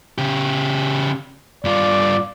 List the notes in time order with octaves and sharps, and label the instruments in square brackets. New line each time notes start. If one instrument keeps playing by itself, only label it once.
[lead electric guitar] C#3 G4
[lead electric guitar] G2 F4 [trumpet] D5